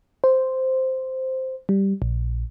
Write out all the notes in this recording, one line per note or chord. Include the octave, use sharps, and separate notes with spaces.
C5
G3
A#1